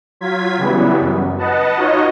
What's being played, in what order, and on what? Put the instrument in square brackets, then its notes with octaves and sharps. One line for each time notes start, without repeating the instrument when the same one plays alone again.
[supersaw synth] F#3 F4 G#6 B6
C#3 E3 F#3 G3 B3
F#2
B4 D#5 F#5 A5
D#4 F4 F#4 C#5 D#5